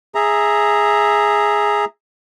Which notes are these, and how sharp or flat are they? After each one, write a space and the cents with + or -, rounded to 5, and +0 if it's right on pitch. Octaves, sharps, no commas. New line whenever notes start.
G#4 +0 E5 +0 A#5 +0